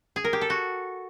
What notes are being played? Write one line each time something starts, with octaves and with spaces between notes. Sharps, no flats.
G#4
A#4
G4
A4
F#4